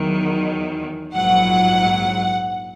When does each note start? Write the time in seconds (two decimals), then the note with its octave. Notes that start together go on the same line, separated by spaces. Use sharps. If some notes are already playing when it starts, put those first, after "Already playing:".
Already playing: E2 D#3 F#3
1.14 A#1 G#2 F#3 F#5